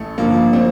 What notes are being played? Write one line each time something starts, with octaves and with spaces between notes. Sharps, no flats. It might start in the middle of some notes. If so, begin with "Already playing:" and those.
Already playing: A1 A3
G2 D3 F3 A#3
C4